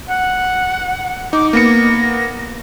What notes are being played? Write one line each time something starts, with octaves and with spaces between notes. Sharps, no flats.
F#5
D#4 D6
A#3 B3 A#6 C#7